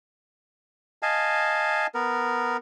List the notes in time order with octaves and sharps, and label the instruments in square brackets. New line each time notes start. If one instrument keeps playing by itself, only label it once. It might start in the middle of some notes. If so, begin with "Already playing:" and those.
[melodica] D#5 F5 G#5 A5
B3 A#4